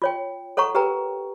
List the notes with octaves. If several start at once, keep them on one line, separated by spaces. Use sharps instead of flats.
F4 C#5 G5
A4 C#5 F#5 A#5 C#6
G4 A#4 B4 G5 A#5